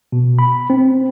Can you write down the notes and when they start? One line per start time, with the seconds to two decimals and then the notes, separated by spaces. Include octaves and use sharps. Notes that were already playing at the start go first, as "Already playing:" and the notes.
0.12 B2
0.39 B5
0.70 C4